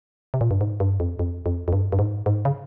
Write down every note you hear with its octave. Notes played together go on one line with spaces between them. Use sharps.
C3
A#2
G2
G#2
G2
F2
F2
F2
F2
G2
G2
G#2
G#2
C#3